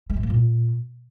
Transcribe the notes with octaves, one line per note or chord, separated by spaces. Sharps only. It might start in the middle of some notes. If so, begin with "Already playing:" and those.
G#3
G#2
A#3
A#2